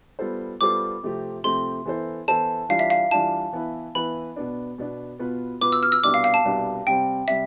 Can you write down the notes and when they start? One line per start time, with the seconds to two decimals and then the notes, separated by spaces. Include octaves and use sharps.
0.19 G3 B3 F4 A4 C5
0.61 G3 B3 F4 A4 C5 D6
1.03 C3 F3 A3 C4 G4
1.44 C3 F3 A3 C4 G4 C6
1.85 E3 B3 E4 A4 C5
2.28 E3 B3 E4 A4 C5 A5
2.69 E3 G3 D4 F4 F5
2.79 E5
2.90 F5
3.11 E3 G3 D4 F4 A5
3.52 E3 B3 E4 B4
3.95 E3 B3 E4 B4 B5
4.36 B2 B3 D4
4.78 B2 B3 D4
5.19 B2 B3 F4 B4
5.61 B2 B3 F4 B4 D6
5.72 E6
5.83 F6
5.92 E6
6.03 C2 B2 B3 D4 G4 D6
6.14 F5
6.24 F5
6.34 A5
6.44 C2 B2 B3 D4 G4
6.87 C3 G3 C4 G5
7.28 C3 G3 E5